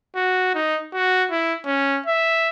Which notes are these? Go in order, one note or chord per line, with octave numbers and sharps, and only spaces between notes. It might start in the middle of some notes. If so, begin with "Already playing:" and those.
F#4
D#4
F#4
E4
C#4
E5